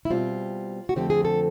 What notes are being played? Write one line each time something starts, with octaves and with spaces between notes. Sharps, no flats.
E4
B2 G3 C4 F4
F#4
F2 D3 F3 A3 C4 G4
G#4
A4